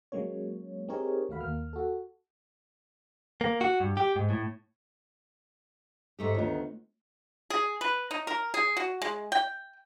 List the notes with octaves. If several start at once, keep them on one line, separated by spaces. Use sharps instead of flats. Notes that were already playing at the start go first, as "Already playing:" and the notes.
F#3 G#3 A#3 C#4 C#5
C4 D#4 G4 G#4 A#4 C#5
D#2 A3 F#4 F5 B5
D#2 A#3 F6
F#4 A4
A#3
F#4
G2
G4
G#2
A2
G#2 A3 G4
D2 D#3 A3 B3 F4 C#5
G#4
B4
D#4
A#4
G#4
F#4
G#3
G5